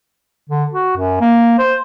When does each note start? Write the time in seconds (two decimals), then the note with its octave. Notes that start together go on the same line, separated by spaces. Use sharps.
0.50 D3
0.73 F#4
0.97 F#2
1.21 A#3
1.59 C5